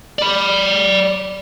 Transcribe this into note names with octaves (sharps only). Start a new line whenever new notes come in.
D5 B5